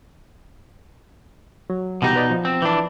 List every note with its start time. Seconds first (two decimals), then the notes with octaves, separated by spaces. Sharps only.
1.70 F#3
2.02 C2 B2 E3 D#4 G4
2.16 B4 D5 D#5
2.31 F3
2.45 C4
2.62 E3 D4